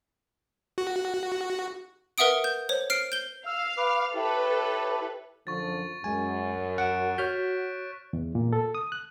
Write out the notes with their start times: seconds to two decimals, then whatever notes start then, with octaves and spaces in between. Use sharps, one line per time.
0.78 F#4
2.18 A#4 B4 E5 F#5 D#6 D7
2.44 G6
2.69 C5 C#5
2.90 F6 C7 D7
3.12 G6 G7
3.46 F5 E6 F6
3.78 B4 D6
4.15 E4 G4 A4 B4 C#5
5.47 F#2 D3 F3 C#6 A6
6.04 F#2 G#3 G#5
6.78 F#5 F#6 D7 E7
7.18 F#4 C#5 F6 G6 B6
8.13 E2
8.35 A#2
8.53 A4
8.75 D#6
8.92 F#6